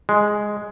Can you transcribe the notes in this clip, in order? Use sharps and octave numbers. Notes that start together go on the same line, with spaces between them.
G#3